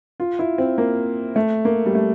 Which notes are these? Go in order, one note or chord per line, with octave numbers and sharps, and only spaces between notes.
F4
E4
C4
A#3
A3
A#3
G3
A3